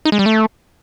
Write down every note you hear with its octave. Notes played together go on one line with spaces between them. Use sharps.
D#4
G#3
G3
A3